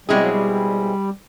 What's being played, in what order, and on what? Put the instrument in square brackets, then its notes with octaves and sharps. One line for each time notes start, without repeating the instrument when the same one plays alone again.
[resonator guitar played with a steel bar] B2 G#3 C4 E4 G#4 [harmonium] G3
[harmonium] F#3
G3